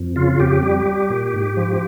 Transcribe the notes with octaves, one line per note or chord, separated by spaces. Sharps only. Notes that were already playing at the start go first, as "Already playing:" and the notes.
Already playing: F2
C#3 F4
F2 G4
G3
G3
A#2
G#2
F3